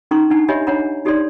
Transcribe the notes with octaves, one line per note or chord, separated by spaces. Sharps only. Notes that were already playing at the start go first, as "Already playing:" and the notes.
C#4 D#4 A4 A#5 C6 C#6
D4 D#4 F#5 A5
G4 C#5 D#5 E5 G#5 B5
D4 C#5 F#5 A#5 B5
D#4 G4 A4 C#5 D5 C6